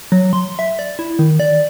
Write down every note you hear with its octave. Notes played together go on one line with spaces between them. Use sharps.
F#3
C6
E5
D5
E4
D#3
D5